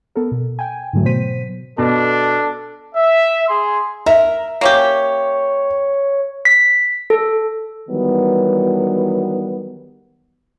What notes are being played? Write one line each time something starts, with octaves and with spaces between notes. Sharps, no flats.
B3 A4 A#4
B2
G5 G#5
G#2 D3 E3 F#3 A3
B2 F#3 B3 C5 B6 D#7
B2 D4 A4
E5
G#4 C6
A#4 E5
A#3 C#4 G4 C#5
B6
A4
D#3 E3 F#3 G3 B3